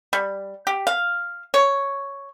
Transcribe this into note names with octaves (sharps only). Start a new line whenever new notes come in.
G3
G4
F5
C#5